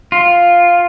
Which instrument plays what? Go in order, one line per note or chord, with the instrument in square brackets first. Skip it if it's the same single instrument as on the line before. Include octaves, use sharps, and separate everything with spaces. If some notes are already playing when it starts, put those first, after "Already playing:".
[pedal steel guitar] F4